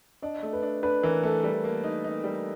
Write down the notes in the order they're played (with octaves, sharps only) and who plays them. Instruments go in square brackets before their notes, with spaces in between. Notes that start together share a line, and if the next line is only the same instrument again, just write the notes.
[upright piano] D4 [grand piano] D#5
[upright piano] A3
[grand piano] B4
[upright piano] D4
[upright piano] D4 [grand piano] B4
[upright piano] E3 [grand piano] A#4
[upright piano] A3 [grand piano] A4
[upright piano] G3
A#3
D#4
D#4
G3